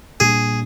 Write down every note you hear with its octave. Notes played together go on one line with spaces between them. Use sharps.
A#2 G3 A#3 D4 G#4